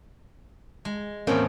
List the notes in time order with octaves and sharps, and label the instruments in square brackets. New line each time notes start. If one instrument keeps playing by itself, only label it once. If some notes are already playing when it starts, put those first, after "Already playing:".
[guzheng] G#3
[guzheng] E2 A2 G5 [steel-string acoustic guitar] A#3 [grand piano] C4 C#4